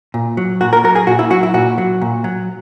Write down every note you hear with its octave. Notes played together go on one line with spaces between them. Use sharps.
A#2
F#3
A#2 F#4
A#4
F#3 A#4
G#4
A#2 F#4
E4
F#3 F#4
E4
A#2 F#4
F#3
A#2
F#3